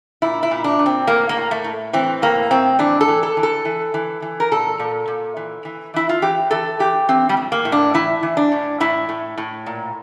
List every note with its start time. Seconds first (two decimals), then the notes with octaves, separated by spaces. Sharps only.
0.22 A#2 E4
0.43 E4
0.51 A#2
0.64 D4
0.79 A#2
0.86 C4
1.07 A2 A#3
1.29 A#3
1.37 A2
1.51 A3
1.64 A2
1.93 E3 C4
2.22 A2 A#3
2.51 A2 C4
2.79 E3 D4
3.01 A4
3.08 E3
3.23 A4
3.37 E3
3.43 A4
3.65 E3
3.94 E3
4.22 E3
4.40 A#4
4.51 A#2 A4
4.79 A#2
5.08 A#2
5.37 E3
5.65 E3
5.94 E3 E4
6.09 F4
6.22 E3 G4
6.51 E3 A4
6.79 E3 G4
7.09 E3 C4
7.29 G3
7.37 A2
7.52 A#3
7.65 A2
7.72 D4
7.94 E3 E4
8.23 E3
8.37 D4
8.52 A2
8.80 A2 E4
9.09 A2
9.38 A2
9.66 A#2